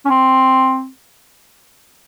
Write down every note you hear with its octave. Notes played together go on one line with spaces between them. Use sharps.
C#4
C4